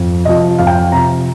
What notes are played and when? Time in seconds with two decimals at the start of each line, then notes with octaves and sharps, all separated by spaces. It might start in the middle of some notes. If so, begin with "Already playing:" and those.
Already playing: F2
0.25 C3 F3 D#5
0.59 F2 F5
0.67 G5
0.74 F5
0.92 C3 F3 A#5